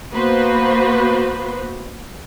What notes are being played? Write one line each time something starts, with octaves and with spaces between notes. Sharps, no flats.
A#3 B3 F#4 B4 C5